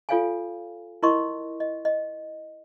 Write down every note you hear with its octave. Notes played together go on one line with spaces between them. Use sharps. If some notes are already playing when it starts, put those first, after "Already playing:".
F4 A4 C#5 F5 G5 G#5
E4 A#4 D#5 C6 C#6
D#5
D#5